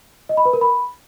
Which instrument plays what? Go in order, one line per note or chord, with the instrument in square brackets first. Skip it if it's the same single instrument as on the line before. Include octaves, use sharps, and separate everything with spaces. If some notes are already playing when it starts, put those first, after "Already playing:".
[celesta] D#5
B5
B4
A#4
B5